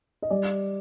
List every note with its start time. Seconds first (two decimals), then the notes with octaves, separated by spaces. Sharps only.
0.22 D#5
0.30 G3 D5